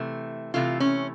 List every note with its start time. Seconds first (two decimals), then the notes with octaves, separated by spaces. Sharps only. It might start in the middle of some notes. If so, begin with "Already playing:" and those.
Already playing: C3 E3 A3
0.54 C3 E3 A3 F4
0.80 C#4